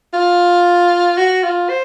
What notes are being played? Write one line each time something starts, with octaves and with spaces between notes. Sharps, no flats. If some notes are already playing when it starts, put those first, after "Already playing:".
F4
F#4
F4
C5